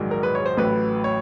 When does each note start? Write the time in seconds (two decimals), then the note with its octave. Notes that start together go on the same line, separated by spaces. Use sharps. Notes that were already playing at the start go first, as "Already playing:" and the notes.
Already playing: A#1 G#2 D#3 F#3
0.11 A#4
0.23 B4
0.35 C#5
0.46 C5
0.57 A1 A2 F#3 B4
1.04 C#5